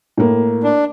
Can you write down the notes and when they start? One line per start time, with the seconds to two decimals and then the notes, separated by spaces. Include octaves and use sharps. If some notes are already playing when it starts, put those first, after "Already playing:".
0.17 A2 A#3
0.63 D4